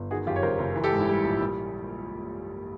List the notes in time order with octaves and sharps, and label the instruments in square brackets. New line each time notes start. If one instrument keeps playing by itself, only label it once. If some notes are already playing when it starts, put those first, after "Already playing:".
Already playing: [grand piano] G1
D#3 F#4 G#4
F#2 F4 G4
C#5
F#1 A#4 C5
F#1
E3
G4 A4
G#2
E4
G3
A#1
G3